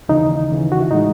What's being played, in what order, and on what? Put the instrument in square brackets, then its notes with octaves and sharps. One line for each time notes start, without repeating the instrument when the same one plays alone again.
[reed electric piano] D#2 C#3 E3 D#4
D#2 C#3 E3
F#4
E4
A2 E3 G#3 D#4